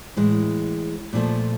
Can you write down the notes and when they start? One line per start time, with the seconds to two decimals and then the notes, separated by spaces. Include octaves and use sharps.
0.16 A2 E3 G#3
1.13 A#2 F3 A3